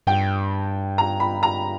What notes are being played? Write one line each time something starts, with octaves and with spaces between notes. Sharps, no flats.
G2 G5
A#5
B5
A#5